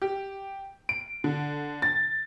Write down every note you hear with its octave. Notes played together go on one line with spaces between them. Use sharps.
G4
D7
D3
A6